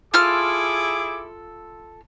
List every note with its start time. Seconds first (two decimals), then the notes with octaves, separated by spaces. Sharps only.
0.14 E4 F4 G#4 A4 D6 F6